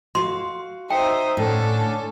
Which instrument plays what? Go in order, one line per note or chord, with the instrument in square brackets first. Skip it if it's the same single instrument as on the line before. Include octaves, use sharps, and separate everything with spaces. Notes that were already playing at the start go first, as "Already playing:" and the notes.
[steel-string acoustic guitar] F#4 F5 [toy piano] C6
[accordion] D#4 E5 D#6 [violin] C5 [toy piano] G5
[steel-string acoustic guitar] A2 [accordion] D3 C#4 D4 [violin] A4